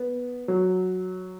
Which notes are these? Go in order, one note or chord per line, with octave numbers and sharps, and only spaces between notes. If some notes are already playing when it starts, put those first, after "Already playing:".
Already playing: B3
F#3